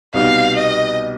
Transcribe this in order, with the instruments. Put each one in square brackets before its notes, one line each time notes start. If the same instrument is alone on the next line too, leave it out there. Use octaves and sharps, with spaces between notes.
[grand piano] C2 B2 G3 B3 D#4 [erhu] F5
[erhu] D#5